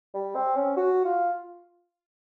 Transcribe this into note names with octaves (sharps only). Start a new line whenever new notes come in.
G3
C4
C#4
F#4
F4